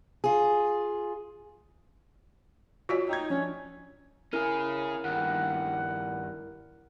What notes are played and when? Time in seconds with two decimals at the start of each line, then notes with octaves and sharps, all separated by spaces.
0.24 F4 G#4
2.89 F4 F#4 C#5 E6 B6
3.09 D#4 G5 G#6
3.30 F3 C#4 D4
4.33 C#4 E4 G#4 A#4
5.05 G2 D#3 F#5